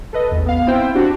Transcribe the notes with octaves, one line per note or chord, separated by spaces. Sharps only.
A4 B4 D#5
A1 E2
B3 F5
B3 C4 E4 C5 G5
D4 F#4 G4